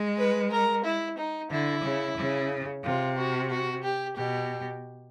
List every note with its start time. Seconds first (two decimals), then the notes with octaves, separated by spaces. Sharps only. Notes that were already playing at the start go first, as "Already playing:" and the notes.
Already playing: G#3
0.18 B4
0.51 A#4
0.85 E4
1.18 D#4
1.51 D3 E4
1.84 C#3
2.18 C#3
2.84 C3 F4
3.18 F#4
3.50 F#4
3.84 G4
4.17 B2 G4